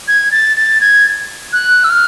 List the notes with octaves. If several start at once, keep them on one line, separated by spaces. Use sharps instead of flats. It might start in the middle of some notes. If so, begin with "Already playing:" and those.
G#6
A6
A6
G#6
F#6
E6
F6